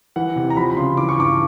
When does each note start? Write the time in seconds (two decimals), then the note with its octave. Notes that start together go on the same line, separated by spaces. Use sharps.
0.16 E3 F#5
0.36 C3
0.50 A#5
0.57 F3 B5
0.71 B5
0.77 C#3 C6
0.97 E3 D6
1.09 C#6
1.18 G2 D6